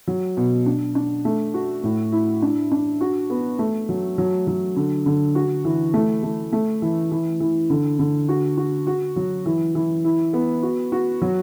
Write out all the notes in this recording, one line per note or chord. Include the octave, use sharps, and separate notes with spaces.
F#3
B2
D4
D4
A3
F#4
A2
E4
D4
D4
F#4
B3
A3
F#3
F#3
F#3
D3
D3
F#4
E3
A3
A3
A3
E3
E3
E3
D3
D3
F#4
F#4
F#4
F#3
E3
E3
E4
B3
F#4
F#4
F#3